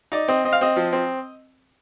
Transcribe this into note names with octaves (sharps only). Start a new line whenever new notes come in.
D#4 D5
C4 D#5
C4 D#5
F5
C4 D#5
F3
C4